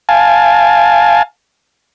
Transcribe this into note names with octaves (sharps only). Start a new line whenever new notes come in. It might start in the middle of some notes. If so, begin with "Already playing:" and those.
F5 G#5 A5